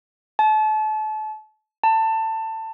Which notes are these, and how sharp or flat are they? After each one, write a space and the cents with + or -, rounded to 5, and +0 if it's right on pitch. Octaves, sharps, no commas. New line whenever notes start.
A5 -35
A5 +20